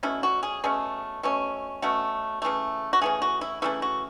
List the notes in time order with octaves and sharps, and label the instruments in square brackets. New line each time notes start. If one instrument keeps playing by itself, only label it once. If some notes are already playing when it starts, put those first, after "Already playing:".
[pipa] B2 A3 C#4 E4
F#4
G#4
B2 A3 C#4 G#4
B2 A3 C#4
B2 A3 C#4 F#4
C#3 E3 A3
F#4
C#3 E3 A3 G#4
F#4
E4
C#3 E3 A3 E4
F#4